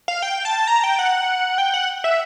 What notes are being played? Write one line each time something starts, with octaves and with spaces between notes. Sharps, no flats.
F5
G5
A5
A#5
G5
F#5
G5
F#5
E5